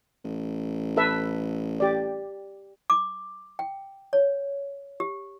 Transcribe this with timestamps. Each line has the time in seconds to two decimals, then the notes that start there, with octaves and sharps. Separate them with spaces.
0.24 A1
0.97 A4 B4 E5
1.80 G4 D5
2.90 D6
3.59 G5
4.13 C#5
5.00 G4